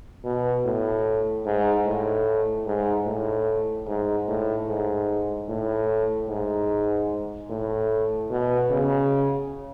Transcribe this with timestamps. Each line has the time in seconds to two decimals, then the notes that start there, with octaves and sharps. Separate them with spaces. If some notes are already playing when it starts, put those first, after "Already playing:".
0.25 B2
0.65 A2
1.46 G#2
1.86 A2
2.66 G#2
3.07 A2
3.87 G#2
4.28 A2
4.68 G#2
5.49 A2
6.29 G#2
7.50 A2
8.31 B2
8.71 C#3